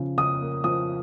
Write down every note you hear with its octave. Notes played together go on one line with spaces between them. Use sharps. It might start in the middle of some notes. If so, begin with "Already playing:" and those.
Already playing: C#3 F3
C#3 D#6
A#3
F3 D#6